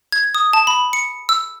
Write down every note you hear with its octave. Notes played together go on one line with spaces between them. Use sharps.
G#6
D#6
A5
B5
C#7
E6